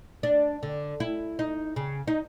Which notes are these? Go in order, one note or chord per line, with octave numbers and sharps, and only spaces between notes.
D4
D3
E4
D#4
C#3
D#4